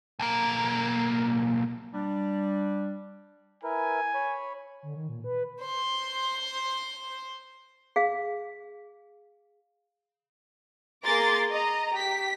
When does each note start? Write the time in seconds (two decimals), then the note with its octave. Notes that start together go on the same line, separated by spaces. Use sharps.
0.19 B1 A#3
1.94 G3 D4
3.64 E4 A#4 B4 G#5
4.14 C#5 B5
4.83 D3
4.96 D#3
5.09 A#2
5.24 B4
5.61 C5 C6
7.96 G#4 F5
11.05 A#3 G#4 A#5 C6 D6 A6
11.51 D#5 A#5
11.94 G4 B6